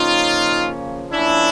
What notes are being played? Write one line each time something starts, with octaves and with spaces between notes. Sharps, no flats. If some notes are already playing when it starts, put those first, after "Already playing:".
Already playing: C#3 F3 A#3 C#4 D#4 F4
F3 A#3 C#4 D4 E4